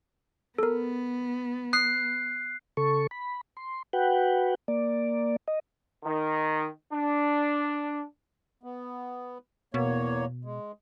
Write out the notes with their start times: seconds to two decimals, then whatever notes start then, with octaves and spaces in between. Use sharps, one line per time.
0.58 B3 A4 A#4
1.73 D#6 F#6 C7
2.77 C#3 A4 C#6
3.11 B5
3.57 C6
3.93 F#4 B4 F#5 G5
4.68 A#3 D5
5.48 D#5
6.03 D#3
6.92 D4
8.63 B3
9.74 E2 B2 A#3 C#5
10.45 G#3